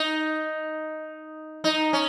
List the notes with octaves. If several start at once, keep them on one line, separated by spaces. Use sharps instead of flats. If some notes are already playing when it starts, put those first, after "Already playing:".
Already playing: D#4
D#4
C#4